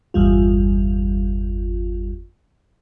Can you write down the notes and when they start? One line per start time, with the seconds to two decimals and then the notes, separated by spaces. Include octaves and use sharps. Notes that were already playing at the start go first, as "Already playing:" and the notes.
0.14 G1 E2 G3 F4